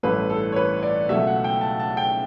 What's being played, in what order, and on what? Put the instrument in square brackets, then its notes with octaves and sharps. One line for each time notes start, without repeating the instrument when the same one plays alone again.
[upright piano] A1 G2 E3 A3 B4
A4
C#5
B4
D5
C#2 B2 F#3 A3 E5
F#5
G5
A5
A5
G5